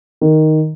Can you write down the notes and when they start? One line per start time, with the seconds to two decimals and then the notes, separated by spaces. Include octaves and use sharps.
0.21 D#3